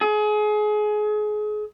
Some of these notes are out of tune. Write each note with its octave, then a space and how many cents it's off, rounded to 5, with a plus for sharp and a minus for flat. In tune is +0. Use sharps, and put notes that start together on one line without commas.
G#4 +30